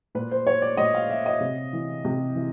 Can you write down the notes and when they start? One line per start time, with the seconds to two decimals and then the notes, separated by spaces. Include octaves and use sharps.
0.15 A#2 B4
0.31 C5
0.47 C#5
0.62 D5
0.77 A#2 D#5
0.94 F5
1.10 E5
1.26 D#5
1.41 C3
1.73 E3
2.05 C3
2.35 E3